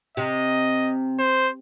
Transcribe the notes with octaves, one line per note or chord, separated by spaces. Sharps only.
C3 D#5
C5